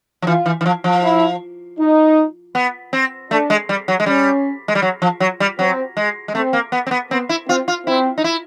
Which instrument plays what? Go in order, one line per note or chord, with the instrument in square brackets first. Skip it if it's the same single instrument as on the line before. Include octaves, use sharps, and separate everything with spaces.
[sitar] F3
[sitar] E3 [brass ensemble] F4
[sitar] E3
E3
F3
F3
[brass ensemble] E4
D#4
[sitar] B3
C4
[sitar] A3 [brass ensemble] D4
[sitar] G#3
G3
F#3
G#3
[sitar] G3 [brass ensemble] C#4
[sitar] G#3
G3
F#3
F3
F#3
G3
[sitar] F#3 [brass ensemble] C4
[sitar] G#3
G#3
[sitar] A3 [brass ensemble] C4
[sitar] A#3
B3
C4
B3
[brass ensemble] B3 [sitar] C4
[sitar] E4
[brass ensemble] C4 [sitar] F4
[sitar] F4
[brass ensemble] C4 [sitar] E4
[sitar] D#4
E4